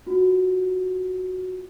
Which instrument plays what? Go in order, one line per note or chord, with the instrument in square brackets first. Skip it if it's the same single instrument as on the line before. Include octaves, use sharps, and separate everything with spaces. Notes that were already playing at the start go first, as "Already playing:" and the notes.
[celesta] F4 F#4